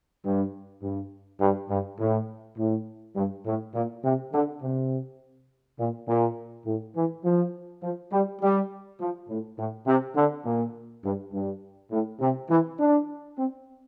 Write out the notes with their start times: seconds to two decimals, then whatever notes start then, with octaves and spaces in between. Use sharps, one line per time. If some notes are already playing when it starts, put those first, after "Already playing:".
0.25 G2
0.83 G2
1.40 G2
1.70 G2
1.99 A2
2.57 A2
3.16 G2
3.46 A2
3.74 A#2
4.04 C3
4.33 D3
4.62 C3
5.79 A#2
6.08 A#2
6.66 A2
6.95 E3
7.24 F3
7.83 F3
8.12 G3
8.42 G3
9.00 F3
9.29 A2
9.58 A2
9.87 C3
10.16 D3
10.45 A#2
11.04 G2
11.33 G2
11.91 A2
12.20 C3
12.49 E3
12.79 D4
13.37 C4